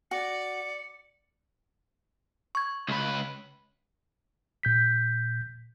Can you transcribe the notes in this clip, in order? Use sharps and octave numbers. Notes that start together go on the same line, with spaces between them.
F#4 D5 C#7
C#6 G#6
C#2 B4
A#2 G6 B6